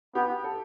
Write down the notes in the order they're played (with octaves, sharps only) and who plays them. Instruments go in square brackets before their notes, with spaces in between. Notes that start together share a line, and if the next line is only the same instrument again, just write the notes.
[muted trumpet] B3 [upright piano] G4
[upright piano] A4